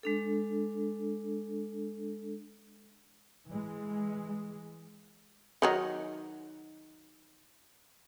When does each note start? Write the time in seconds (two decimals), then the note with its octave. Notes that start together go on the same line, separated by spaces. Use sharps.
0.03 G#3 D4 A4
3.47 E3 G#3
5.62 D#3 F#3 D#4